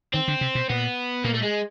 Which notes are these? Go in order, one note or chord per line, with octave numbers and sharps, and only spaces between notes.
D#3 C4
D3
C3
B2
A#2 B3
A#2 A#3
A3
G#3